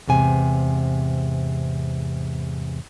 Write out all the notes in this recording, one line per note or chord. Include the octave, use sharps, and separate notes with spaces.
E2 G#2 C3 G#5